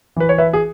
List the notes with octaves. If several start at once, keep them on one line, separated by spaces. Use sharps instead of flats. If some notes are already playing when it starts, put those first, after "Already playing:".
E3 B4
C#5
B4 E5
G#4